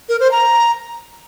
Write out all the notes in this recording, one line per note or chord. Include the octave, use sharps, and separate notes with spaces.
A#4
C5
A#5